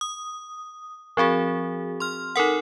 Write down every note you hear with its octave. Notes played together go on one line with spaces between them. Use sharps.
D#6
F3 C4 F#4 G#4
C6 F6
D#4 A4 A#4 F#5